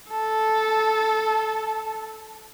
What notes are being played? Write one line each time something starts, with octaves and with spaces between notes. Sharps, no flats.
A4 A5